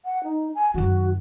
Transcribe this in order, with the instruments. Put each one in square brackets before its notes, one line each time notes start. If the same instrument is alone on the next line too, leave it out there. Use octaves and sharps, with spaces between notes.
[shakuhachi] F#5
D#4
G#5
[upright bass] F#2 D#3 [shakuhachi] F#4